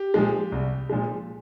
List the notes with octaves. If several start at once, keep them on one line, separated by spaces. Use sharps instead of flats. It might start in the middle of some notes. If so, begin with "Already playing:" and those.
Already playing: G4
A#2 F3 G#3
C2
A#2 F3 G#3